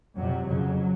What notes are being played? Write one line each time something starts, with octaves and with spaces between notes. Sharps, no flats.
F2 C3 F#3
F2 C#3 F#3